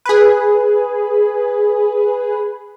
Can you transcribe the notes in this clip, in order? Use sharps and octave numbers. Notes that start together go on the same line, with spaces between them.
G#4 B4